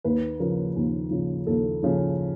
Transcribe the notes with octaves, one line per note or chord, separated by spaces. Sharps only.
D#2 B4
C#3 F3 A#4
D#2
C#3 F3
D#2 A4
C#3 F3